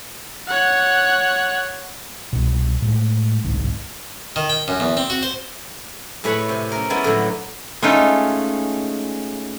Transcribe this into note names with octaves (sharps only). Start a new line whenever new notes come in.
C#5 F#5
C2 B2
A2 G#3
G1 C2 G#2
D#3
G5
F#2
E2
C4
F#4
C5
A2 A3 G#4 B4 C#5 B5
C3
C#4 A#4
G#3 B3 C#4 E4 D5 D#5
A2 D3 F#3
G#3 A3 C#4 D#4 F4